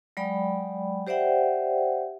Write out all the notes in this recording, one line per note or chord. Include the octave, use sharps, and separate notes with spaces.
F#3 G#3 D5 G5 B5
G4 C5 D5 E5 F#5 G5